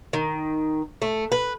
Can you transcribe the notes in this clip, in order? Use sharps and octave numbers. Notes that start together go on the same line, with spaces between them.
D#3
A3
B4